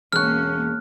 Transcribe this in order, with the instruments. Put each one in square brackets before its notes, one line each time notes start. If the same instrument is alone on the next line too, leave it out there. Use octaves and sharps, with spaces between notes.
[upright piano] E1 C#6 [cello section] A#3 C#4 [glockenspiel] F6 F#6